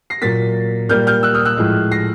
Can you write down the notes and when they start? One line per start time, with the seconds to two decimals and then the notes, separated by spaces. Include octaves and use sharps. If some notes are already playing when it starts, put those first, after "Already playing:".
0.10 A#6 C7
0.22 A#2 F#3 A#3 A6 B6
0.89 A#2 G3 A#3 F6 G6
1.07 F6 G6
1.23 E6 F#6
1.34 D#6 F6
1.45 E6 F#6
1.57 A2 F3 G#3
1.92 A#6 C7